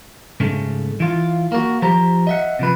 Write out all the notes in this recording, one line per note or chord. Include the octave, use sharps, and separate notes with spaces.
G#2 C#3 A3
E3 F4
A#3 F#4
F3 G4 C5 A#5
D#5 E5 F#5
C3 F3 B4